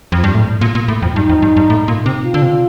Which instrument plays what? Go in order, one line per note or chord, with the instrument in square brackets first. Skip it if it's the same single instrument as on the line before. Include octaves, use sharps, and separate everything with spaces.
[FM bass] F2
G2
A2
A#2
A#2
A2
F2
[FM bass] G2 [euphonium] D#4
[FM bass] F2
G2
G2
A2
A#2
C3
[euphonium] F4
[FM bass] D3
C3